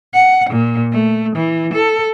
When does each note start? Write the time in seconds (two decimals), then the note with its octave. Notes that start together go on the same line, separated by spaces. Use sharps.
0.13 F#5
0.49 A#2
0.92 A3
1.36 E3
1.73 A4